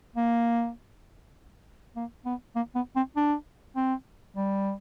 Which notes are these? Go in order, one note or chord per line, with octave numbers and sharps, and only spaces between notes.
A#3
A#3
B3
A#3
B3
C4
D4
C4
G3